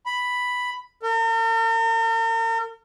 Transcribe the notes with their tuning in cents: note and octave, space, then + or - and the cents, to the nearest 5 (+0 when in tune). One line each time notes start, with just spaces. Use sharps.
B5 +0
A#4 -45